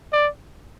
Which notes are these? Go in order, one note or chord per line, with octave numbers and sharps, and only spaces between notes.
D5